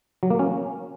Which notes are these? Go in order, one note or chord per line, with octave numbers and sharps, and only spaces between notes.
F#3
A#3
C#4